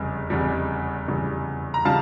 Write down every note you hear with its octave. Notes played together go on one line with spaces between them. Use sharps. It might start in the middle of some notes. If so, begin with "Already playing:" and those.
Already playing: F1 E2 C#3 G3
F1 E2 C#3 G3
F1 E2 C#3 G3
A#5
C#3 G3 F5 A5